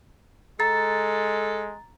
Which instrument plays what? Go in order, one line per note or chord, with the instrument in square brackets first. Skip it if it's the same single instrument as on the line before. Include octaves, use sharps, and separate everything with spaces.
[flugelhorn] G#3 [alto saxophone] A4 [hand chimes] A#5 A6